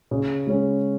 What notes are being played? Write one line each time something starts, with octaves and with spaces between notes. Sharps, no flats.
C#3
G#3 C#4